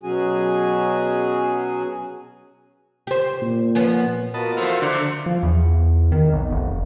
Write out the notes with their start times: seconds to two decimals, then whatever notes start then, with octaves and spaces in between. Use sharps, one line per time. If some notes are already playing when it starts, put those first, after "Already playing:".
0.03 B2 F#3 C#4 F#4 G#4 G#5
3.07 G4 C5
3.42 A#2
3.75 F3 B3 C#4
4.34 B3 F4 F#4 A#4 D#5 A5
4.57 F3 A3 E4 C5 F5
4.82 D3 D4 C5
5.26 F3
5.43 E2
6.12 D#3
6.33 B1
6.51 F1